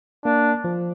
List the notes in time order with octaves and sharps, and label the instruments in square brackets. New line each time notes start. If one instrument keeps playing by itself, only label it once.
[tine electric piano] A#3 [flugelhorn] D4
[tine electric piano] F3